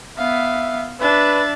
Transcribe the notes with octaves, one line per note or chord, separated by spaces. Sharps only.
B3 E5 F5
D4 B4 E5 A6